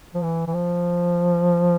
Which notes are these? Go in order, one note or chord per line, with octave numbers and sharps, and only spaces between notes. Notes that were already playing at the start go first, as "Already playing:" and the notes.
F3
E3
E3
F3